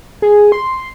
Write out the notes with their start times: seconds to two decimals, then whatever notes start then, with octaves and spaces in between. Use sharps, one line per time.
0.22 G#4
0.52 C6